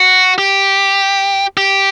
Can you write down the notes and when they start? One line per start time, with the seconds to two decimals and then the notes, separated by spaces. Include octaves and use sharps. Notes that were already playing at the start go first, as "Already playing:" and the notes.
Already playing: F#4
0.38 G4
1.57 G4